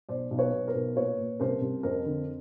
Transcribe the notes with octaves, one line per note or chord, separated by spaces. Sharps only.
B1 C5 D5
B1
B4 C#5
B1
A#4 C5
B1
A#2 B4 C#5
A#2
C2 A#4 C5
C2
F2 A#4 C5
D3